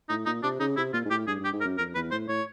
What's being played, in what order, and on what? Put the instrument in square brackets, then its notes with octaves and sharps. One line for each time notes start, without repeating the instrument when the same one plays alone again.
[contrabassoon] A2 [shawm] D#4
[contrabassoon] A#2 [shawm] D#4
[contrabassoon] C3 [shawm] D4
[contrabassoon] C#3 [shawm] D#4
[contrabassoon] C3 [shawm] E4
[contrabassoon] A#2 [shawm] F4
[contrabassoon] G#2
[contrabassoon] A2 [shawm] G4
[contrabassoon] G2 [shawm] G#4
[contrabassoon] G2 [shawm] G4
[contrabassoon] G#2
[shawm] A#4
[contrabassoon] F#2
[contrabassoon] F2 [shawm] A#4
[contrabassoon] E2 [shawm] B4
[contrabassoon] A2 [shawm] C5
[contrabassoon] A2 [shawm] C#5